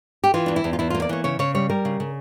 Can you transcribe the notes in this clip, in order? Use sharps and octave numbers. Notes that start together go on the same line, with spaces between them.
G4
E3 F4
E2 D4
E4
E2
F4
E2 E4
A#3 F4
D5
E3 C#5
C#3 C#5
C#3 C#5
G3 C#5
G3 A#4
C#3
C#3